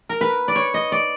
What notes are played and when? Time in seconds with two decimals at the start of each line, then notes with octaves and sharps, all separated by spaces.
0.09 A#4
0.21 B4
0.48 D5
0.55 C#5
0.74 D#5
0.92 D5